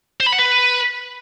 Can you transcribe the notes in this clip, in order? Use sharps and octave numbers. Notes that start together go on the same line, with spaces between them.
C5
B5
F#5
B4